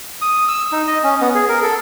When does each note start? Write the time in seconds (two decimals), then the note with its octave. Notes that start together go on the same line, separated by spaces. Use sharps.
0.22 D#6
0.48 E6
0.72 D#4
0.87 D#5
1.04 C#4
1.21 B3
1.35 G#4
1.49 A#4
1.63 A4